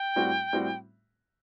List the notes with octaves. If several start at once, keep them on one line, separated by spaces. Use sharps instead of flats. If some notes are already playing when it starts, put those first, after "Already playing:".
Already playing: G5
A2 G3 C4 F#4
A2 G3 C4 F#4